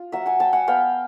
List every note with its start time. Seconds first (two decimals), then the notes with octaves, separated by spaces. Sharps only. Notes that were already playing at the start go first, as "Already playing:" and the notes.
Already playing: F4
0.12 F#3 E5 F#5
0.26 F#5 G#5
0.39 F#3 G5 A5
0.53 F#5 G#5
0.67 B3 F5 G5